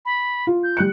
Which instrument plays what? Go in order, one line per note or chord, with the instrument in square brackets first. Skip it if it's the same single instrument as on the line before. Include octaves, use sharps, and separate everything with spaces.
[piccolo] B5
[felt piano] F4
[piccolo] G6
[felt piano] G3 F#6 C#7